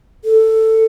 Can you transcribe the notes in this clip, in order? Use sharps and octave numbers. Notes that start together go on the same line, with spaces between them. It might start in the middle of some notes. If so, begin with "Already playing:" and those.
A4